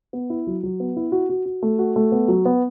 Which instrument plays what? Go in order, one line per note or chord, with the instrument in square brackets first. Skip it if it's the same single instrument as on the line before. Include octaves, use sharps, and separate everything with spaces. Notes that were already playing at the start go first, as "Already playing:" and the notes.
[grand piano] B3
E4
F#3
F#3
B3
E4
F#4
F#4
F#4
A3
F#4
A3
B3
F#3
B3